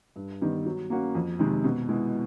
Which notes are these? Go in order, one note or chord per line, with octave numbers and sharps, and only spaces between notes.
G2
D#3 G3 B3
F#3
A#3 C#4 F#4
F2
C3 D#3 G#3
B2
G#3 B3 E4